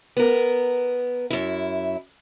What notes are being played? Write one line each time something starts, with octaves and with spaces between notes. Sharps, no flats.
B3 A#4
F#2 E4